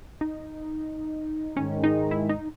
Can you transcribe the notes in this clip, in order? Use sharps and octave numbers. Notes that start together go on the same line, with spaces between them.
D#4
G#2 D#3 G#3 C#4
D#4
E4
D#4